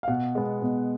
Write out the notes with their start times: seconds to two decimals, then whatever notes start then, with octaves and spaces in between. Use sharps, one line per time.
0.03 F5
0.08 B2 F#5
0.35 G#3 B3
0.62 B2